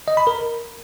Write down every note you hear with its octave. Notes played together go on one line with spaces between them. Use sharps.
D#5
B5
A#4